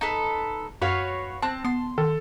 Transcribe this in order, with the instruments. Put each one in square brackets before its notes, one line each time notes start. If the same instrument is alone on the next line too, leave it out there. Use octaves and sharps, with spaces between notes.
[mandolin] D#4 A4 B4
[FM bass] F#2 [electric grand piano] F#4 [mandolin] B4 C#5 F5
[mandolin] C4 F#6 [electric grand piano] A5
[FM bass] B3 [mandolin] C6
[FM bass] D#3 [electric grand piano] A4